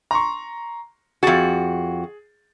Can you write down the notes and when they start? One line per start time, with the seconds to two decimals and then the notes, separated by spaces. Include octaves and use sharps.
0.11 A#5 C6 C#6
1.23 F2 F#4 G#4 A6